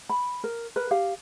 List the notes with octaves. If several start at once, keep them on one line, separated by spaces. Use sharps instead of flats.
B5
A#4
A#4 B4
G4 F5